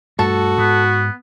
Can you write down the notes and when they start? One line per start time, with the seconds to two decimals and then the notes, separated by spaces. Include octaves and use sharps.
0.19 G2 A3 F#4 A4 A5
0.58 G#2 B3